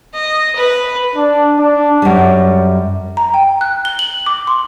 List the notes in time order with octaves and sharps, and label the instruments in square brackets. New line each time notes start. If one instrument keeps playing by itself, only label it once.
[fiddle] D#5
B4
[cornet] D4
D4
[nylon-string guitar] F#2 G3
[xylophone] A#5
G5
F#6
G7
F#7
D6
C6